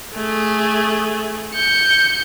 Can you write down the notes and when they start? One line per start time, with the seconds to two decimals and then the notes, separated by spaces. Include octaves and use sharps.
0.15 A3 G#4
1.54 G6 C#7